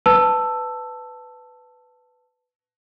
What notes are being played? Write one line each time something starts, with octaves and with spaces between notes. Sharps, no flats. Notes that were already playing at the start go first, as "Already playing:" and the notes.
B4 A5 E6